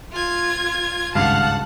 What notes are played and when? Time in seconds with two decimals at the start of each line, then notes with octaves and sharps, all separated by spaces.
0.12 F4 G#6
1.15 G#1 C#2 G2 F5 F#5 A5